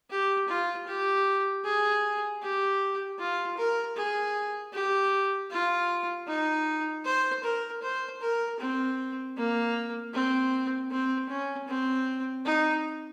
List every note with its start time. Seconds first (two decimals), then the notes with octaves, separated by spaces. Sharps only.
0.10 G4
0.48 F4
0.87 G4
1.64 G#4
2.42 G4
3.19 F4
3.57 A#4
3.96 G#4
4.73 G4
5.51 F4
6.27 D#4
7.05 C5
7.43 A#4
7.82 C5
8.21 A#4
8.59 C4
9.36 A#3
10.13 C4
10.90 C4
11.29 C#4
11.68 C4
12.45 D#4